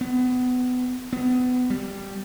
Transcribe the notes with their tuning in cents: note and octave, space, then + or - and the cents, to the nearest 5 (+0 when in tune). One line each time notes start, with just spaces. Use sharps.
B3 +25
B3 +25
G3 +0